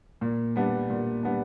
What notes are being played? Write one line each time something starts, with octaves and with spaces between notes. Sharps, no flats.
A#2
G3 B3 D4
A#2
G3 B3 D4